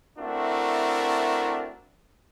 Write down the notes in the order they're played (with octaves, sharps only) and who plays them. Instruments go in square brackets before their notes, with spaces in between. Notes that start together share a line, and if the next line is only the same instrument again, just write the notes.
[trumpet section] A3 C4 D4 E4 F#4 A#4